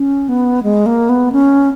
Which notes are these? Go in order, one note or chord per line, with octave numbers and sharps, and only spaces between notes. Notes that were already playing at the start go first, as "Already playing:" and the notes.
Already playing: C#4
B3
G#3
A#3
B3
C#4